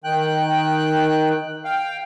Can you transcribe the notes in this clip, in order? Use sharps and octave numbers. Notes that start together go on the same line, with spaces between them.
D#3 G5 F#6
F5 G5